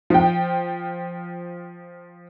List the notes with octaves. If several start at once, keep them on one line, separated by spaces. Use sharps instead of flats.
F3 G5